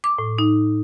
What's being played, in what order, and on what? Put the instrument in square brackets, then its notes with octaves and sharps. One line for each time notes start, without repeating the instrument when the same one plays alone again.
[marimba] D6
A2
D#4